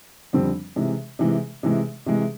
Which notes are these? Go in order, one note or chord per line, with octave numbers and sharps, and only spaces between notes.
F2 D3 G3 C4
C3 E3 G#3
C3 E3 G#3
C3 E3 G#3
C3 E3 G#3